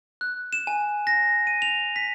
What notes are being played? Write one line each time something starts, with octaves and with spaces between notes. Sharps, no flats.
F#6
E7
G#5
A#6
D#7
F7
B6